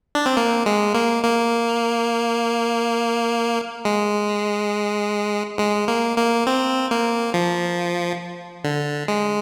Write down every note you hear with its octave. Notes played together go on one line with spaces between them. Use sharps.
D4
C4
A#3
G#3
A#3
A#3
G#3
G#3
A#3
A#3
C4
A#3
F3
D3
G#3